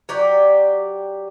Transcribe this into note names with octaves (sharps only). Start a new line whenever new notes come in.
F#3 G4 D5